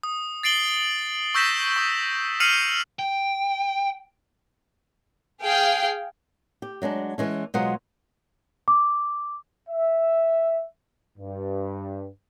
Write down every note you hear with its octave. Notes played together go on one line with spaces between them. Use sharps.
D#6
A6 C7 D7 F#7 G7
C#6 E6 G6 A#6 B6 E7
C#6 D#6
F6 C7 C#7 D#7 F7 F#7
G5
G#4 F5 G5 C7
G4
F#3 G#3 C#4 D4
E3 G#3 C#4
B2 F#3 G#3 F4 C5 F#5
D6
E5
G2